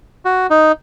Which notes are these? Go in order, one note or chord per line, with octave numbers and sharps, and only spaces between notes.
F#4
D#4